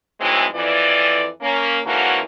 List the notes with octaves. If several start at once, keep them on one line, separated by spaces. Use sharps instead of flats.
G#2 E3 F#3 G#3 A3 C4
F2 E3 D5
A#3 C#4
G#2 D3 E3 A#3 C#4 F#4